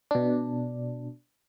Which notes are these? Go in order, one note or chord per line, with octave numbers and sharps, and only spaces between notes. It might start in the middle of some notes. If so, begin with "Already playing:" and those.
B2 D4